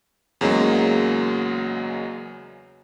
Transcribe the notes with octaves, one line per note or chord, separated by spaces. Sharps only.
E2 C#3 F#3 G#3 A#3